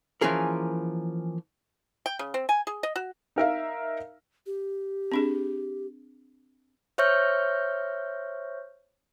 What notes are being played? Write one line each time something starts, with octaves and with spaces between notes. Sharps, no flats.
E3 F3 A#3 C#4 G#4 A#4
G5
C#3
C4
G#5
G#4
D#5
F#4
D#4 A#4 E5 F5
G4
C4 D4 G#4
C5 C#5 E5 C#6 F6 G6